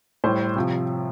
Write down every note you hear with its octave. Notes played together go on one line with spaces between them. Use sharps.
A2 G3 C5
C3 F3